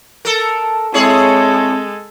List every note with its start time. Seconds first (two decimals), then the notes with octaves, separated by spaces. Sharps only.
0.25 A4 A#4
0.94 G#3 C4 E4 G#4 A4 C#5 A5